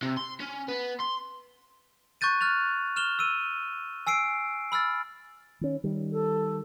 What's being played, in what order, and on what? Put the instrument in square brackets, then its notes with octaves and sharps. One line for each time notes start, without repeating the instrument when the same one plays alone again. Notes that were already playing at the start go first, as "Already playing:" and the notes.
[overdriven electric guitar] C3
C6
C#4
B3
C6
[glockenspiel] C#6 F#6 G6 A6 D#7
F6 F#6 A6 F7
F6 E7 F7 G7
E6 D#7
G#5 E6 C7 D7
B5 E6 F6 A6
[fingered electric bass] D#3 C#4
D#3 G3
[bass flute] A4